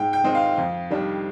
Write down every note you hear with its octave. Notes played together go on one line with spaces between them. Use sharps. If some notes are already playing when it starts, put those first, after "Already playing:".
Already playing: G#2 G5
G5
D#3 G#3 C4 D#4
F5
F2
D#3 G3 D4